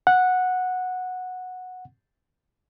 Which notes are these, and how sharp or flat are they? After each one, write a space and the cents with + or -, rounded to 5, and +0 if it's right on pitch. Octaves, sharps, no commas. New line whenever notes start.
F#5 -10